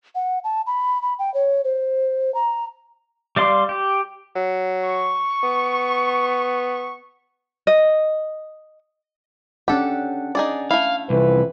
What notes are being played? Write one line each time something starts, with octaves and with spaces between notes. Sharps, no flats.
F#5
A5
B5
B5
G5
C#5
C5
A#5
G3 D5 F5 C6
G4
F#3
C#6
B3
D#5
C#4 D4 G4 A4 F#5
D#4 G#4 D5
A3 E4 F5
C2 F2 E3 B4